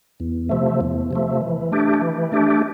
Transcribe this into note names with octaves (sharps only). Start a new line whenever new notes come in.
E2
C3 F3 A3
E2
C3 F3 A3
E3
A3 D4 G4
E3
A3 D4 G4